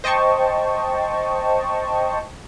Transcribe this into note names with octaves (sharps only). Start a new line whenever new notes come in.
C5 D#5 G5 A5 C#6